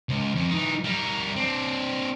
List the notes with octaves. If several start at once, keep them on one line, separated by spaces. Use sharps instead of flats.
C#2
F2
E3 D#4
G3 A#4
C4 D4